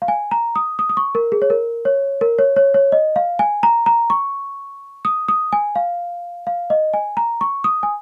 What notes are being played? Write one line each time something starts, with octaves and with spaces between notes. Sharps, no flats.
F5
G#5
A#5
D#6
D#6
D#6
C#6
A#4
G#4
C#5
A#4
C#5
A#4
C#5
C#5
C#5
D#5
F5
G#5
A#5
A#5
C#6
D#6
D#6
G#5
F5
F5
D#5
G#5
A#5
C#6
D#6
G#5